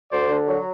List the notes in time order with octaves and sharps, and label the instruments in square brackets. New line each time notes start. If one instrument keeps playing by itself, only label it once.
[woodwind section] D2 [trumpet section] C5 D5
[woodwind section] D3
F#3